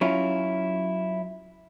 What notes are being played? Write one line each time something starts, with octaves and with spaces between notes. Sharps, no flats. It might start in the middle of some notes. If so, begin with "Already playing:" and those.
F#3 C#4 E4 F4